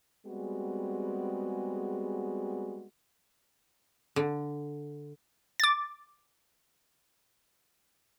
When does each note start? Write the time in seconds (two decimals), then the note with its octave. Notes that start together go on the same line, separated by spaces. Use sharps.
0.25 G3 G#3 B3 C4 F#4 G#4
4.16 D3
5.60 D6 A6